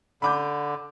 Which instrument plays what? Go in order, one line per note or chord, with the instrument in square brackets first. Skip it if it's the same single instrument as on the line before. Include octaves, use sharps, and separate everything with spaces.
[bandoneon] D3 [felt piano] B5 D6 G6